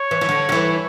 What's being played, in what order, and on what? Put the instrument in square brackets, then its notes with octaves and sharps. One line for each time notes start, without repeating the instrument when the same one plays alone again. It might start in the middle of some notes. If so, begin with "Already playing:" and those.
Already playing: [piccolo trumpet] C#5
[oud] E3
E3
D3
D3
E3